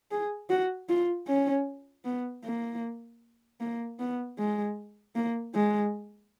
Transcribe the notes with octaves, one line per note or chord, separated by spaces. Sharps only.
G#4
F#4
F4
C#4
B3
A#3
A#3
B3
G#3
A#3
G#3